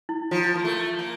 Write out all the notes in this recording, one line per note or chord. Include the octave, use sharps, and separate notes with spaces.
E4
F3 F4
A#3
A3
A#3